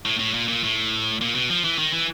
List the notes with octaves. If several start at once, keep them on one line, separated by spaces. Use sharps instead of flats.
A2
A2
A#2
A#2
A2
A#2
B2
F3
E3
D#3
E3